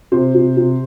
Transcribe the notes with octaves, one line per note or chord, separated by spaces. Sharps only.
C3 C5
C3
C3